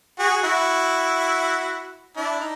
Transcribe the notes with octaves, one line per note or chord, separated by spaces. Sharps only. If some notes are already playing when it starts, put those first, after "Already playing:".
F#4 G#4
E4 F#4
D4 E4
D#4